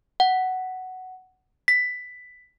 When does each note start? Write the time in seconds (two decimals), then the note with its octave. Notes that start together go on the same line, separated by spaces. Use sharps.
0.20 F#5
1.68 B6